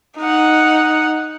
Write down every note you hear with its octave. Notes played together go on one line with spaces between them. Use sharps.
D#4 F#5